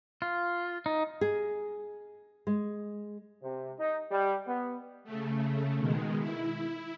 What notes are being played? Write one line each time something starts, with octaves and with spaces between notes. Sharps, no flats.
F4
D#4
G#4
G#3
C3
D#4
G3
B3
C#3 A3
B2 D#3 G#3
E4